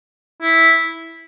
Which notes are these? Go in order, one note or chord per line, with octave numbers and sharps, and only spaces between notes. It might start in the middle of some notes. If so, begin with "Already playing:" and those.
E4